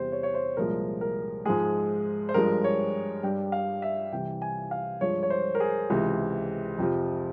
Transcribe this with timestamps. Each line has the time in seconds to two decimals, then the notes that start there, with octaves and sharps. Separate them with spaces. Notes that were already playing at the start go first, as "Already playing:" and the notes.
Already playing: E2 C3 G3 C5
0.12 C#5
0.23 C#5
0.35 C5
0.57 C2 A#2 F3 G#3 A#4
1.01 A#4
1.45 G#2 F3 G#3 G#4
2.29 C5
2.34 G2 F3 G#3 A#4
2.64 C#5
3.23 G2 G3 G5
3.52 F5
3.82 E5
4.12 C2 C3 E3 G5
4.42 G#5
4.71 F5
5.01 G2 F3 G#3 C#5
5.23 C#5
5.30 C5
5.55 A#4
5.60 G#4
5.90 C#2 C3 E3
6.78 F2 C3 F3